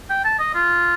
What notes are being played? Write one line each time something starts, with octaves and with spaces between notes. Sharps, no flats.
G5
A5
D#5
F4